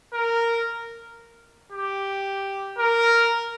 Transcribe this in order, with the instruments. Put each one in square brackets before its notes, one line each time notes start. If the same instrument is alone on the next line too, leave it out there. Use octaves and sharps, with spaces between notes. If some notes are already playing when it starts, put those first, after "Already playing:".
[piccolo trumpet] A#4
G4
A#4